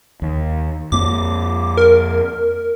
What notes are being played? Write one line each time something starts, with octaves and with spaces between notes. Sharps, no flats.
D#2
F2 A#3 D6
A#4